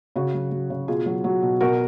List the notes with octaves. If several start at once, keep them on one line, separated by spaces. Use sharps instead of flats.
C#3 F#4
F#3
F#3
C#3
B2 F4 G#4
F#3
F#3
B2
B2 F#4 A#4